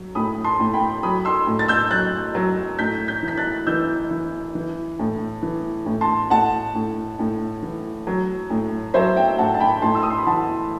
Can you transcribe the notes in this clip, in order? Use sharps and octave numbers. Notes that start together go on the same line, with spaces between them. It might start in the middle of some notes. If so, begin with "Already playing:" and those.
Already playing: F#3
A2 B5 D#6
A5 C6
A2
G5 B5
F#3 B5 D#6
C6 E6
A2
A6
E6 G6
F#3 F#6 A6
F#3
A2 G6 B6
G6 B6
E3
B6
F#6 A6
E3 E6 G6
E3
E3
A2
E3
A2
A5 C6
A2 F#5 A5
A2
A2
E3
F#3
A2
F#3 C5 E5
E5 G5
A2 F#5 A5
A5
G5 B5
A2 A5 C6
E6
D#6
C6
B5
E3 F#5 A5